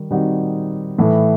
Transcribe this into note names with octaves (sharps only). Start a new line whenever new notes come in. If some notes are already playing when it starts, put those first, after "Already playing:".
Already playing: D#3 G3
D#3 G3 C4 D#4 F#4
A2 E3 A3